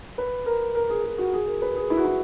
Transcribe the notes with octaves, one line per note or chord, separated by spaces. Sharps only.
B4
A#4
A#4
G#4
G#4
F#4
G#4
A#4
B4
G#4
E4
F#4
E4